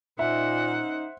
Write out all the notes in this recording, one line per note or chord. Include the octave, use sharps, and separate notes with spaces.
A#2 D#3 C#4 D#4 C5 E5 F#5